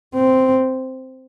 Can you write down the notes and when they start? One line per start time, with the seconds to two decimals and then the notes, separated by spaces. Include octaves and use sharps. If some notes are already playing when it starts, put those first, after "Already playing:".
0.15 C4